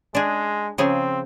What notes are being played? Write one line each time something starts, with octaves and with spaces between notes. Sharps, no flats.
G#3 D4 G#4
C#3 F3 C4 G#4